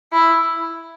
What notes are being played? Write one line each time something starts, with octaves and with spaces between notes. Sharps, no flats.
E4